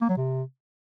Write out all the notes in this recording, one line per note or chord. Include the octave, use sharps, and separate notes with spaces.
A#3
F#3
C3